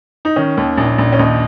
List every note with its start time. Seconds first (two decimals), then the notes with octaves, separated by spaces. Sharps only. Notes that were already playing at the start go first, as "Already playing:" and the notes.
0.25 D#4
0.36 D#3 C#4
0.57 D#2
0.78 A#1
0.98 A#1
1.12 C#4
1.19 D#2 D#4